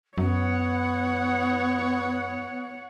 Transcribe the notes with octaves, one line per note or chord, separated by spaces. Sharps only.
F#2 B3 C#5 F#5